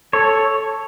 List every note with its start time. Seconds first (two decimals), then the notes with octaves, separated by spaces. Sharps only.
0.13 A4 C#5